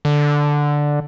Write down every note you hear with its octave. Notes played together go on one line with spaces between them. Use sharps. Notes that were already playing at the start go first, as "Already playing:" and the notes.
D3